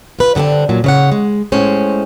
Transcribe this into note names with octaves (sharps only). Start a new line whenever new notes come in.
F4 B4
G2 D3 B3 C4 D4
A#2 F3 F#3
C#3 C#5 F#5
G#3
A2 G#3 C#4 C5